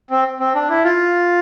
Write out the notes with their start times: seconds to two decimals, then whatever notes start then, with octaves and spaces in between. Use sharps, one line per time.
0.11 C4
0.40 C4
0.55 D4
0.70 E4
0.84 F4